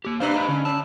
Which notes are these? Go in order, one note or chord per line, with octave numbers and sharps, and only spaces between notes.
A#3 G4
G2 D4 G4 B4 C5 F5 A#5
D#4 C5 D#5
D3 C#4
C#4 A5 E6